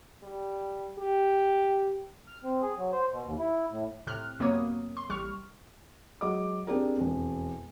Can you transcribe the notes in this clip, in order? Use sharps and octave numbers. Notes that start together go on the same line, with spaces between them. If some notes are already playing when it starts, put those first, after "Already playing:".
G3
G4
F6
C4
G#4
F#3
C5
B2
D#2
E4
A2
A2 C3 F6 F#6
F#2 C3 A#3 B3 C#5 D#6
C6
A1 G3 C#6 F6
F#3 G#3 D#5 D6
C4 D4 G4 G#4 A#4
E1 F2